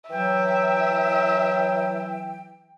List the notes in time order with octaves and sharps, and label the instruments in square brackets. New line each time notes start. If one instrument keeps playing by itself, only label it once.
[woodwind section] E3 F#3 G5 [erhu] E5